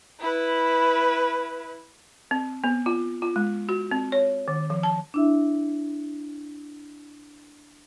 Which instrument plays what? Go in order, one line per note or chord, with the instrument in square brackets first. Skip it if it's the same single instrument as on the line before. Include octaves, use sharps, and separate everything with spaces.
[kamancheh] E4 B4
[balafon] C4
B3
F4
F4
G#3
F#4
C4
C#5
D#3
F3
A5
[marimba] D4 E4 E5